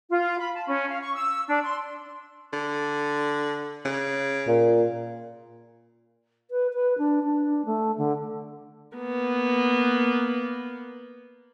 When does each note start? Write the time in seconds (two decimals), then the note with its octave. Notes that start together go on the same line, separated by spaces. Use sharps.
0.10 F4
0.39 B5
0.54 A5
0.67 C#4
0.89 F5
1.01 C#6
1.14 E6
1.49 D4
1.63 C6
2.53 D3
3.85 C#3
4.48 A#2
6.51 B4
6.74 B4
6.98 D4
7.23 D4
7.66 A3
7.98 D3
8.97 A#3 B3